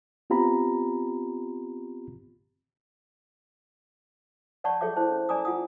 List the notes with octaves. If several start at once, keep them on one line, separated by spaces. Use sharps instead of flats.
B3 C4 F4 G4 A#5 B5
C#5 D5 F#5 A5 B5 C#6
G#4 A4 C#5 E5 D6
E4 C5 A5
C#4
D5 G#5 A#5 D6 D#6
F4 F#5 D#6